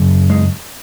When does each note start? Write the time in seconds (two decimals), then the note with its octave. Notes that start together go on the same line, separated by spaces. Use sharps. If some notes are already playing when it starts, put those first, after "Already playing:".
Already playing: F#2 C#3
0.30 G#3